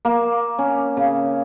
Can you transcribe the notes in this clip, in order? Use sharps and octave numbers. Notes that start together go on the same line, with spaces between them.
A#3
C#4
C#3